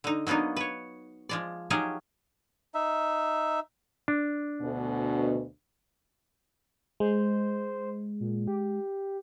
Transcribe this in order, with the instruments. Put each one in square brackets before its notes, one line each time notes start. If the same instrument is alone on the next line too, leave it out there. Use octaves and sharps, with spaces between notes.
[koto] D3 D#4
F#3 A#3 B3 D4 D#4
B4 C#5
F3 G#3 D5
F3 F#3 C#4 D#4 G4 G#4
[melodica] D#4 E5
[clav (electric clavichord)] D4
[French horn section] D2 B2
[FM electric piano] G#3 [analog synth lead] C5
[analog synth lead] A#2
G4